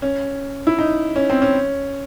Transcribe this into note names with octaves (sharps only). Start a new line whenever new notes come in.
C#4
E4
D#4
C#4
C4
C#4